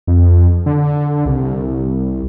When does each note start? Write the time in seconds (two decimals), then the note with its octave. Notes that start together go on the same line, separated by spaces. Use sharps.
0.07 F2
0.66 D3
1.26 C2